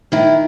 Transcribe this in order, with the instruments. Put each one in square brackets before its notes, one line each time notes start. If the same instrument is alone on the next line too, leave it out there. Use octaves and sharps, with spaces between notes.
[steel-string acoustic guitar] D#3 E4